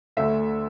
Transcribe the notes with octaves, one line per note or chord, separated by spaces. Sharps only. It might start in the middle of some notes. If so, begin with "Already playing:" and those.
D2 D3 A3 E5